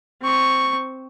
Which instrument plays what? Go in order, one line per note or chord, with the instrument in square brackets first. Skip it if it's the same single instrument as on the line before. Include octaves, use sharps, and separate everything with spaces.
[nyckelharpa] C4 C#6